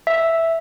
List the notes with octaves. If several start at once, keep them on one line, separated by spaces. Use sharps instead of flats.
E5